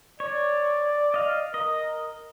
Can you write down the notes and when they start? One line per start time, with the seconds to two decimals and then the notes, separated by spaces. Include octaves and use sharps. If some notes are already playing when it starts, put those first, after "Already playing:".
0.20 C#5 D5
1.14 D#5 F5
1.54 A#4 D#5